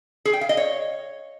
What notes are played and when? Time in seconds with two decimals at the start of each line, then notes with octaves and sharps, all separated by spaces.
0.25 G#4
0.33 G5
0.41 F5
0.49 D#5
0.57 C#5